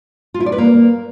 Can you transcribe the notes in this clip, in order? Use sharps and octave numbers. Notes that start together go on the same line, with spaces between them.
F4
E4
D5
B4
A#3